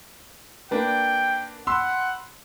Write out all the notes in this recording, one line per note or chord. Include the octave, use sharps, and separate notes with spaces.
A#3 D4 B4 G5
F#5 B5 C6 E6